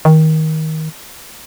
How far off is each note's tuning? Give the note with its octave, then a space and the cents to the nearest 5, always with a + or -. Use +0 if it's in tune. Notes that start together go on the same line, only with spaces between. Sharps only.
D#3 +20